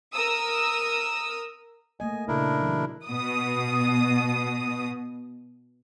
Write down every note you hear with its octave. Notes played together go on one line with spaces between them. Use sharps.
A#4 D#6 E6
A3 A#3 D#5 G#5
A#2 C#3 D4 E4 A4 A#4
E3 F#3
B2 D#6